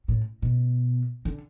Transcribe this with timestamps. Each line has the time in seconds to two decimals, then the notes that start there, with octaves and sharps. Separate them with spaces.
0.08 A2
0.42 B2
1.25 D3